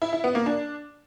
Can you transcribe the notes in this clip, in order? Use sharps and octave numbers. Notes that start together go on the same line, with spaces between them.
E4
E4
B3
A#3
D4